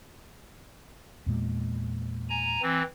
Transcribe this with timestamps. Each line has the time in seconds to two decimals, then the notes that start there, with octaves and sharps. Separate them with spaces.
1.26 E2 A#2 G#3
2.29 G#5 A#5
2.62 E3 C4